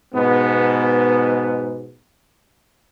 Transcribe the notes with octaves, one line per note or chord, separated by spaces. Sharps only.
G#2 B2 B3